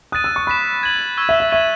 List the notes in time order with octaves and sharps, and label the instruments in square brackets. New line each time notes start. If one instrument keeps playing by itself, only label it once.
[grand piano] D#6 [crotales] F#6 A6 D#7
[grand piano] E6
C#6
[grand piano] B5 [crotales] F#6 B6 E7
[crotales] G#6 D#7 F#7
C#6 E6 G#6 D#7
[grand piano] E5
E5
[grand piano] E5 [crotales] C#6 G#6 D#7 F#7